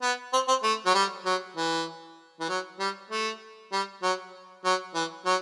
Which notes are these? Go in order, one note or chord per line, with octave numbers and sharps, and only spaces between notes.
B3
C4
C4
A3
F#3
G3
F#3
E3
E3
F#3
G3
A3
G3
F#3
F#3
E3
F#3